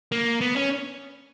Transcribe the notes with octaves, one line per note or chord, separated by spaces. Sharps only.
A#3
B3
C#4